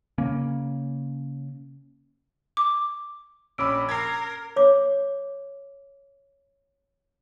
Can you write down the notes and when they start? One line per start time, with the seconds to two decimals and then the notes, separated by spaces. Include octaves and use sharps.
0.18 C#3 A#3 C#4
2.57 D6
3.58 A#1 C#4 B5 D6 E6 D7
3.89 A#4 G#6 C7
4.56 C#5 D6